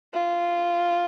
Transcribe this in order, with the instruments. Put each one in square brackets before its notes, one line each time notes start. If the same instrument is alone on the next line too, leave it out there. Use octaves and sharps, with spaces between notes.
[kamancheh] F4